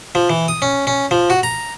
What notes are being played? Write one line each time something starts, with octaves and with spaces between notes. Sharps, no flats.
F3
E3
D#6
C#4
C#4
F3
F#4
A#5